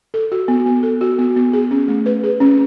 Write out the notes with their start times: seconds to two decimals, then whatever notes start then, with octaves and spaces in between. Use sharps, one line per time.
0.14 A4
0.32 F#4
0.48 B3
0.66 B3
0.83 A4
1.01 F#4
1.18 B3
1.36 B3
1.53 G#4
1.71 C#4
1.88 A3
2.06 B4
2.23 G#4
2.40 C#4